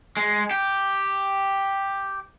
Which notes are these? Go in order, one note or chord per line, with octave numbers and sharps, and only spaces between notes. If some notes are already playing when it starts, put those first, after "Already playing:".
G#3
G4